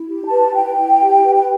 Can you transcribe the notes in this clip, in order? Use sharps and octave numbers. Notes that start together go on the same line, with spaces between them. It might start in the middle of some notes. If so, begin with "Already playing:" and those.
Already playing: E4
G4
A5
B4
E4 G5
E4
G4
B4
G5